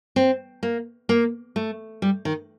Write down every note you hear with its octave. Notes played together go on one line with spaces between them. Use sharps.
C4
A#3
A#3
A3
G3
D#3